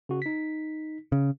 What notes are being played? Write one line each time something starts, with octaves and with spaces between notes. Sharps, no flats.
C#3 F#4
D#4 B6
C#3